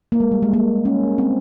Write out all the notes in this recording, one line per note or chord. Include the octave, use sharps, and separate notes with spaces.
A#3
G#3
G3
G#3
A#3
C#4
C4